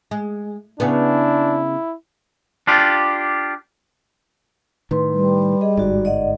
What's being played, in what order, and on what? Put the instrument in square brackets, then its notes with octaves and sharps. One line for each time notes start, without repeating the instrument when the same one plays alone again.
[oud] G#3
[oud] C#3 B3 [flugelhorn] D4 [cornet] E4
[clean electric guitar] D4 F4 G4
[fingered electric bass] A2 D#3 [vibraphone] B4 C6
[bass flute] G3
[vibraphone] G#4 D#5
[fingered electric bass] G1 G#2 [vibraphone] F#4 D5
[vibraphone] D5 D#5 F#5